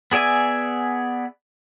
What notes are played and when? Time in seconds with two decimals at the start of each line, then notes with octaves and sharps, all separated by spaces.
0.12 B3 G#4 D5 E5 G#5